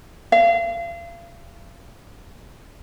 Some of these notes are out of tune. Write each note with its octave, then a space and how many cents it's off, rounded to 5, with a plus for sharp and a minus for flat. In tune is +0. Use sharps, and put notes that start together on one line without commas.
F5 -35